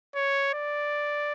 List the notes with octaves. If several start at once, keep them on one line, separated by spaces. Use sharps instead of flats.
C#5
D5